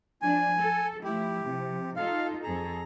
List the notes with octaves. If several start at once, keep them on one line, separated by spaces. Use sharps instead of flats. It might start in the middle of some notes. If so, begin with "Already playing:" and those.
F3 D4 G#5
A4
F3 A3 E4 G4
C3 F3
D#4 F4 A4 F5
F2 G#4 A4 A#5